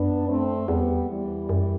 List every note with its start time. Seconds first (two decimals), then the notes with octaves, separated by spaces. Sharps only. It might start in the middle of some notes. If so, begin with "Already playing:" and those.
Already playing: F#2 B3 D4
0.28 A3 C4
0.68 E2 G3 B3
1.09 E3 G3
1.49 F#2